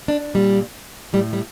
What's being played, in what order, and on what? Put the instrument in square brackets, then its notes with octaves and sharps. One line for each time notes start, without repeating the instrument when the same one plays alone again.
[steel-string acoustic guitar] D4
A#2 G3
A2 G3
G3